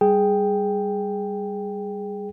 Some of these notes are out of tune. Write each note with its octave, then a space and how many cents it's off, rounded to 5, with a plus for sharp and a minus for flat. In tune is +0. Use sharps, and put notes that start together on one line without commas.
G3 +10 G#4 +0 G5 +0